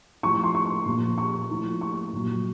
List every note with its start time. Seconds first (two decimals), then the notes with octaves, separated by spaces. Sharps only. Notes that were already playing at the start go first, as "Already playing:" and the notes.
0.23 A2 F3 C#6
0.44 C6
0.55 C#6
0.86 A#2 F3
1.18 C#6
1.50 A2 F3
1.81 C#6
2.13 A#2 F#3